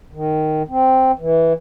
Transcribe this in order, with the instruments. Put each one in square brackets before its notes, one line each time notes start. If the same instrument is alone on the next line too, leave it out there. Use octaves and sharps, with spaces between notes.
[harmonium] D#3
C4
E3